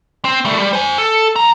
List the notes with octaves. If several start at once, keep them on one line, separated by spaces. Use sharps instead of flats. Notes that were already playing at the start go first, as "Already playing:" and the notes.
C4
G3 A3
G3
C5 G#5
A4
E2 A#5